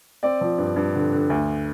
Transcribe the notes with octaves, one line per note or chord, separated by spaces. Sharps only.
C4 D5
F3
G2
G2
D3
D3
D2